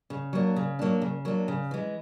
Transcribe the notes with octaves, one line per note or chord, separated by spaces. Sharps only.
C#3
F#3 A#3 D4
C#3
F#3 A#3 D4
C#3
F#3 A#3 D4
C#3
E3 G#3